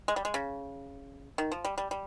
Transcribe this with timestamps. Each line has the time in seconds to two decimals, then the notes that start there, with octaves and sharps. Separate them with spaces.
0.08 G#3
0.16 G3
0.25 G#3
0.34 C#3
1.38 D#3
1.52 F3
1.65 G3
1.78 G3
1.91 G3